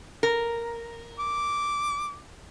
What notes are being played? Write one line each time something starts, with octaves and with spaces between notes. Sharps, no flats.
A#4
D6